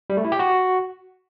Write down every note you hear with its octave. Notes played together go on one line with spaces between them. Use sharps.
G3
A3
E4
G4
F#4